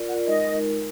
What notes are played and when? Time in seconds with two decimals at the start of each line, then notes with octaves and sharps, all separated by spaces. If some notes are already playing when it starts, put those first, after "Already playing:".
Already playing: F4 A#4 D5
0.09 F#5
0.27 G#3 D#4 A#4 D#5